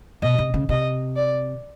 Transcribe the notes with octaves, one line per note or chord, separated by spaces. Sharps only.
B2 D#5
C3
C#3
C3 D#5
D5